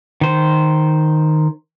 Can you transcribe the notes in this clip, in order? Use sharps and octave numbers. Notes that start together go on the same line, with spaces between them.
D#3 C5